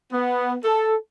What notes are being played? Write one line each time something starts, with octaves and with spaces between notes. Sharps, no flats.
B3
A4